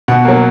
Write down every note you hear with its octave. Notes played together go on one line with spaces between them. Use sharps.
B2 F#5
F#3 A#3